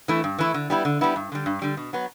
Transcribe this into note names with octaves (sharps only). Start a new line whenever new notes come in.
E3 A3 E4
G2
E3 A3 E4
D3
G3 B3 E4
D3
G3 B3 E4
G2
D3 G3
G2
D3 G3
B2
F#3 B3